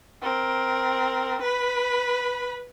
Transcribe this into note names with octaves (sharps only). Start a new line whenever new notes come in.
C4 A#4
B4 B5